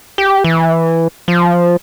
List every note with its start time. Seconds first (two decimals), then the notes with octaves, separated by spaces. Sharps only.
0.18 G4
0.44 E3
1.28 F3